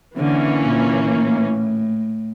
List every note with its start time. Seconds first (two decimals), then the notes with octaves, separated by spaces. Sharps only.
0.17 D3 E3 A#3 C#4
0.62 A#2
1.08 A2